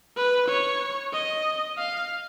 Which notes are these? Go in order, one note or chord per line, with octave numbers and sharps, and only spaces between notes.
B4
C#5
D#5
F5